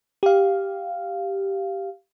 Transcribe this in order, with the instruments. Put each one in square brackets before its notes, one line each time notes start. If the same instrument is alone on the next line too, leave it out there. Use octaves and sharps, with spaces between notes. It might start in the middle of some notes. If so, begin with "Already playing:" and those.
[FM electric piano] G4 F5